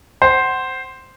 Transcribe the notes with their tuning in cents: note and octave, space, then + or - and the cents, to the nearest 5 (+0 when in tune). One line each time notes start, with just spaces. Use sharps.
C5 +0 F#5 +25